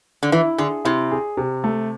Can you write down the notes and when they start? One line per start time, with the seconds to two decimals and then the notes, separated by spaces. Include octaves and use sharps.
0.23 D3
0.32 E3 E4
0.58 D3 G#4
0.85 C3 E4
1.11 G#4
1.37 C3
1.64 A3